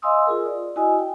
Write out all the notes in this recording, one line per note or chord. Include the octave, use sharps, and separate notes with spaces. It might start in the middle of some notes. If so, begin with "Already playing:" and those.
D#5 F5 G#5 C6 D#6 E6
F4 G#4 A#4
D5
E4 F#4 D#5 G#5 D#6
G5